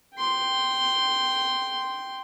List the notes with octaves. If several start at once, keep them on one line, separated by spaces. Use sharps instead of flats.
G5 C6